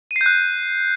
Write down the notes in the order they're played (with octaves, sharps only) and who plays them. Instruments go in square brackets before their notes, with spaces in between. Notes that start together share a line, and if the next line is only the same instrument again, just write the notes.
[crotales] D#7
C7
G6
F#6